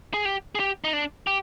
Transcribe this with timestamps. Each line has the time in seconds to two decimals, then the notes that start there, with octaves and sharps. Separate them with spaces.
0.14 G#4
0.25 G4
0.55 G#4
0.60 G4
0.84 D#4
0.93 D4
1.27 G4